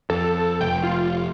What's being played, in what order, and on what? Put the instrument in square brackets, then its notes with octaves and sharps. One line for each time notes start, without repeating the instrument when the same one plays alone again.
[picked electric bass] F2 [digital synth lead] A4
[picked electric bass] F1 [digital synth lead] G5
[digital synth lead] F4